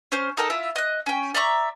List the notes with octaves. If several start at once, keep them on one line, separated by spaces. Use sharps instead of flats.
C#4 C5 F6
D#4 A4 A#4 G5
E4 F4 E5
D#5 F#6
C#4 G5
D5 E5 A#5 C#6